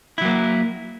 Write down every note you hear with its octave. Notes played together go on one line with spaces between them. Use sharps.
F#3 A#3 E4